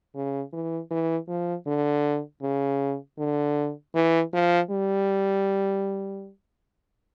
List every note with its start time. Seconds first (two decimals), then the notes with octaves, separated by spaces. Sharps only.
0.15 C#3
0.53 E3
0.91 E3
1.28 F3
1.67 D3
2.42 C#3
3.18 D3
3.95 E3
4.33 F3
4.70 G3